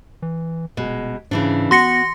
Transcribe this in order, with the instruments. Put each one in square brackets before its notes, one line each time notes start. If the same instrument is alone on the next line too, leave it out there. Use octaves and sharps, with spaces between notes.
[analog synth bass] E3
[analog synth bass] D#1 [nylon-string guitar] B2 G#3
[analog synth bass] G#2 [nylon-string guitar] C#3 E3 D4
[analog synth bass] B3 [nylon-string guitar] F#4 [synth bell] C6 A#6 C#7